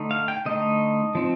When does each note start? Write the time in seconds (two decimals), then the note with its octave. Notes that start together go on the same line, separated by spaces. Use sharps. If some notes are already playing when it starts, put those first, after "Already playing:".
Already playing: D3 A3 D#4
0.11 F5
0.28 G5
0.45 D3 A3 D#4 D#5
1.15 F3 C4 D#4